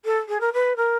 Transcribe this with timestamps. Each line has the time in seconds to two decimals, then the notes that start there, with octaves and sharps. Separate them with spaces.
0.05 A4
0.28 G#4
0.40 A#4
0.53 B4
0.76 A#4